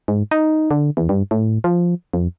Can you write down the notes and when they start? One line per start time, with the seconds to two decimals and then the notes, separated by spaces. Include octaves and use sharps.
0.08 G#2
0.31 D#4
0.71 D3
0.97 E2
1.09 G2
1.31 A2
1.64 F3
2.13 F2